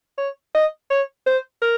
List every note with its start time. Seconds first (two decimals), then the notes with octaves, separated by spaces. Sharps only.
0.18 C#5
0.55 D#5
0.90 C#5
1.27 C5
1.62 A#4